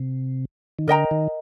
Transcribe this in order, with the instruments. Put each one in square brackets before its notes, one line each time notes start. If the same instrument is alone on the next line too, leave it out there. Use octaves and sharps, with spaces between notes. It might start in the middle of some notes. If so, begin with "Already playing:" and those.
Already playing: [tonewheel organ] C3
D#3
[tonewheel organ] D3 [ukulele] A#4 D#5 G5 A#5
[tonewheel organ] D#3